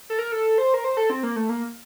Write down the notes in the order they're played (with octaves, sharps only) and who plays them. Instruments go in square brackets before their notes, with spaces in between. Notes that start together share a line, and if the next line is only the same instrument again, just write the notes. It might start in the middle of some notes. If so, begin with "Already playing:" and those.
[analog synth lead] A4
A#4
A4
C5
A#4
C5
A4
C4
A#3
A3
A#3